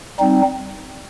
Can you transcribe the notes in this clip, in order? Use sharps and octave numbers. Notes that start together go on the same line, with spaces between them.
G3 C4 D#4